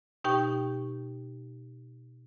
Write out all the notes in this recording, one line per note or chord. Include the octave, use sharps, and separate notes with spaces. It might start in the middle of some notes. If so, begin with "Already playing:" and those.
B2 D#4 G4 G5 C#6